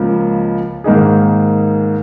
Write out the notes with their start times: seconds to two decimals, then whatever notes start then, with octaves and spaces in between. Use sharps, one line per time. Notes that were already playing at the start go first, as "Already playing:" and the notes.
Already playing: C#2 C#3 F3 A#3
0.84 G#2 D#3 A#3 D#4 G#4